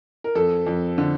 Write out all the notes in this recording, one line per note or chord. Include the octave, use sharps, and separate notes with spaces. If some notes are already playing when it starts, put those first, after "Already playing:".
A#4
F2 A4
F2
D3